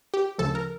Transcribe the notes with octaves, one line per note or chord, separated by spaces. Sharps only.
G4
D2 C#3 F3 A4
A#4